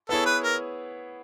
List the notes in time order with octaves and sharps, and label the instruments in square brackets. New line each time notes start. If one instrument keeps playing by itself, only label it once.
[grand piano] B3 E4 G#4 C#5 [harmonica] A4
[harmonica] B4
A#4